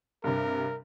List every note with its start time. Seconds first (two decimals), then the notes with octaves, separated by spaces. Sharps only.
0.24 G2 C3 A#4